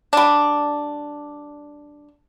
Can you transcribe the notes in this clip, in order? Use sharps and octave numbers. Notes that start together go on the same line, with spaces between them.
G3 D4